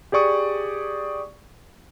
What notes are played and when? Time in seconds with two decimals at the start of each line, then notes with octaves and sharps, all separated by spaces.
0.12 G4 G#4 D5 C#6 D#6